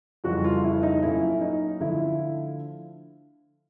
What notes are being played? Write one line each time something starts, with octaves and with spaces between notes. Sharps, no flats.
F2 C#3 E3 G3 F#4
F4
E4
D#4
A#2 F#3 A3 C#4 E4
D#4
D3 F3 A3 E4